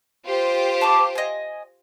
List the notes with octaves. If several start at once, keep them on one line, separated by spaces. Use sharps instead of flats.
F4 G4 C5
A5 C#6 D6
D#5 G#5